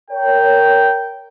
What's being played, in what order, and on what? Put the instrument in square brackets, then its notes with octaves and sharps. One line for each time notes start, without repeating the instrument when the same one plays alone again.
[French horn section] A#4 C#5 [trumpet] G5